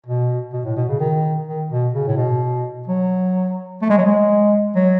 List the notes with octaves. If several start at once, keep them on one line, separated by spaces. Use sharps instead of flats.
B2
B2
A2
B2
C#3
D#3
D#3
B2
C#3
A2
B2
F#3
A3
G#3
F#3
G#3
F#3